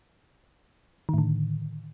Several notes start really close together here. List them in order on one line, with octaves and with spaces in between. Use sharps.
D#3 A2 D3